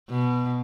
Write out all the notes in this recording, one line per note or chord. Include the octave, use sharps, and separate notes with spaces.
B2